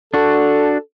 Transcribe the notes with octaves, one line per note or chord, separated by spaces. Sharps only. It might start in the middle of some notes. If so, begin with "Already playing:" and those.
D4 F#4 A4